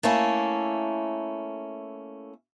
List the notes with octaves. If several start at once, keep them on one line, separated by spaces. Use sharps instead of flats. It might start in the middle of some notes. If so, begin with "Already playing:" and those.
A3 A#3 C#4 E4